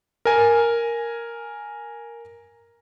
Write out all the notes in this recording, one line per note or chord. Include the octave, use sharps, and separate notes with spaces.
A#4 G#5